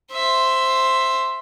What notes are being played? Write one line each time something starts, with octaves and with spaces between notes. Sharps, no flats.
C5 E5